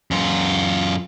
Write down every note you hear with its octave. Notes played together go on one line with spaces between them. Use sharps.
F#2 F4